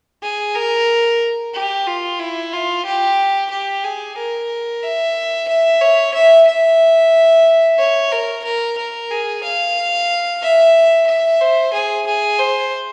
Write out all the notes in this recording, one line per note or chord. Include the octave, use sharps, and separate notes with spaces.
G#4
A#4
G4
F4
E4
F4
G4
G4
G#4
A#4
E5
E5
C#5
E5
E5
C#5
A#4
A#4
A#4
G#4
F5
E5
E5
C5
G#4
G#4
C5